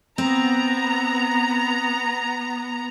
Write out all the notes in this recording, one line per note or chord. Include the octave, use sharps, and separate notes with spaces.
B3 C4 A#5